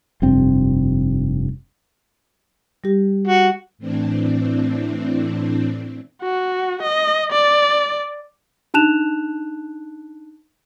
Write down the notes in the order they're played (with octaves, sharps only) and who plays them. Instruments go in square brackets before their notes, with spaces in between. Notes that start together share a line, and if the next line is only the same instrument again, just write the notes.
[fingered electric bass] F1 G2 C4
[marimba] G3 G4
[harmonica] F#4
[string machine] A2 E3 C4 D4
[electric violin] F#4
D#5
D5
[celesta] D4 D#4 A5 F#6 E7 F7